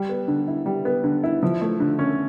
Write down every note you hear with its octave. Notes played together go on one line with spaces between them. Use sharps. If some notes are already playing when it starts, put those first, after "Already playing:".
Already playing: G3
B3
D3
E4
G3
B3
D3
E4
F3
A3
D3
C#4